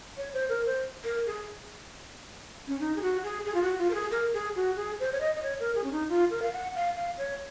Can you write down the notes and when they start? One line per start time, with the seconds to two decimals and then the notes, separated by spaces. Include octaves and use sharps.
0.17 C#5
0.33 C5
0.49 A#4
0.66 C5
1.04 A#4
1.26 G#4
2.68 C#4
2.80 D#4
2.96 G#4
3.02 F#4
3.24 G#4
3.45 G#4
3.54 F4
3.63 F#4
3.79 F4
3.91 A#4
3.94 G#4
4.11 A#4
4.34 G#4
4.56 F#4
4.77 G#4
5.00 C5
5.12 C#5
5.20 D#5
5.35 D#5
5.43 C#5
5.60 A#4
5.75 G#4
5.84 C#4
5.92 D#4
6.09 F4
6.31 A#4
6.42 F5
6.53 F#5
6.75 F5
6.96 F5
7.18 C#5